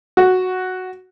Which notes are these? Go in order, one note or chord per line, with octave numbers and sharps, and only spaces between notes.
F#4